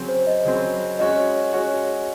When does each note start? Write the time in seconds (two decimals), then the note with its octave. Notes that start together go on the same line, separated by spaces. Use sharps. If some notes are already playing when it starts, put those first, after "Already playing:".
Already playing: C#3 F#3 C4
0.08 C5
0.27 D#5
0.45 C#3 F#3 C4
0.99 G#3 C#4 F#4 C#5 D#5
1.53 G#3 C#4 F#4 C#5